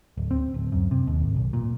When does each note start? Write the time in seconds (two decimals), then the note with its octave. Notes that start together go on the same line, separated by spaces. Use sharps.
0.17 D1
0.31 C4
0.54 D1
0.72 F#2
0.91 C3
1.07 D#2
1.20 G#1
1.36 B1
1.53 A#2